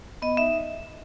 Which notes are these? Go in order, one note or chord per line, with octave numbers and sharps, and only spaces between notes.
B3 D#5
D#4 E5